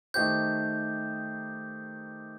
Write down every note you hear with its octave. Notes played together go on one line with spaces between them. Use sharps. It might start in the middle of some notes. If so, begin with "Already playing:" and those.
D#3 A3 D#4 G4 C5 G6